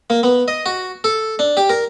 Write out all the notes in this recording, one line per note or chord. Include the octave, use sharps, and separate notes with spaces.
A#3
B3
D#5
F#4
A4
D4
G4
A#4